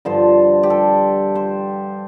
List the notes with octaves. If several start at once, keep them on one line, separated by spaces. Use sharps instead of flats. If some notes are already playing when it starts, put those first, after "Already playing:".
G2 D3 F3 C5
G4
A4
C5